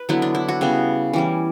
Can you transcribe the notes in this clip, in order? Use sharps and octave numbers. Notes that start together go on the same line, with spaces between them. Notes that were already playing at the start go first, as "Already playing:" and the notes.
Already playing: B4
D3 F#3 B3 E4
D4
E4
F#4
C#3 G3 B3
E3 G3 C#4